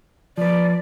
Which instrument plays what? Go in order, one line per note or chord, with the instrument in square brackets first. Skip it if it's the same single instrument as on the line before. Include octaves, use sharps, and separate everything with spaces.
[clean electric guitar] F3 B4 [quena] D5